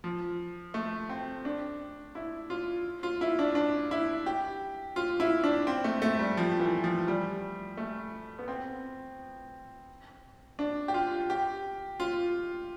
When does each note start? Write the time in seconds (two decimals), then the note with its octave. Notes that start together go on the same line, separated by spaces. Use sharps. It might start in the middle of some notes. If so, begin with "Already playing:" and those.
0.04 F3
0.74 A3
1.09 C4
1.45 D4
2.15 E4
2.50 F4
3.03 F4
3.21 E4
3.39 D4
3.55 D4
3.91 E4
4.26 G4
4.96 F4
5.20 E4
5.44 D4
5.67 C4
5.84 A3
6.02 A3
6.19 G3
6.37 F3
6.60 E3
6.84 F3
7.08 G3
7.77 A3
8.39 B3
8.48 C4
10.59 D4
10.88 G4
10.94 F4
11.30 G4
12.00 F4